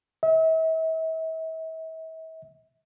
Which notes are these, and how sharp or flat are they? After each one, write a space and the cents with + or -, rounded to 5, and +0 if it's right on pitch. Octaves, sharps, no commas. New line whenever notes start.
E5 -40